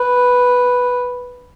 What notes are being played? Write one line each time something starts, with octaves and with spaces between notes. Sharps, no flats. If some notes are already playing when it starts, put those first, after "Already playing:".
Already playing: B4